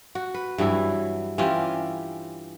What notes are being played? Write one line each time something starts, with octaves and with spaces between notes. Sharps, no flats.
F#4
B4
G2 E3 F#3 E4
E3 C#4 F4 G4